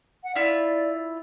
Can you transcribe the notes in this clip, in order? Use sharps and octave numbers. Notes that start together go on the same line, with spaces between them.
F#5
E4 F4 D5